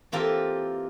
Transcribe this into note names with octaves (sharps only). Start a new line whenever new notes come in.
E3 A#3 C4 F4 G4 A4